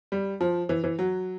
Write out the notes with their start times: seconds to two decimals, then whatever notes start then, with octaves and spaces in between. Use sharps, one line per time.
0.12 G3
0.41 F3
0.69 E3
0.84 E3
0.99 F#3